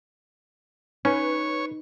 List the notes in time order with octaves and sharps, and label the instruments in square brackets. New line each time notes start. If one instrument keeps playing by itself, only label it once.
[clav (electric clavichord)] C#4 [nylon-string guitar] D#4 [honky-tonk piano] B4 [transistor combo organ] C#5